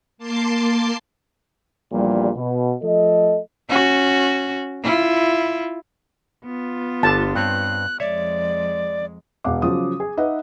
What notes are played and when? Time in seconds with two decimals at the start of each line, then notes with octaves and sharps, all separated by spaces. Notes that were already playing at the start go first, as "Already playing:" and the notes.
0.18 A#3 A5 C6 D6 C7
1.93 A#1 E2 A#2 G3
2.37 B2
2.83 F3 A3 A4 D#5
3.69 C#4 F#4
4.83 E4 F4
6.44 B3 F4
7.03 G1 D3 A5
7.35 G2 C4 C#5 F#6
8.00 F2 G#3 C#5 D5 E5
9.44 E1 F5 F#5 D6
9.62 C#3 F3 F#3 D#6
10.00 G#4
10.17 D#4 B4 D#5 E5 F#5